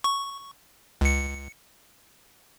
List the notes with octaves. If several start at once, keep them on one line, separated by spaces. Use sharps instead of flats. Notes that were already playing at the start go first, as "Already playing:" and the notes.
C#6
C#2 C#7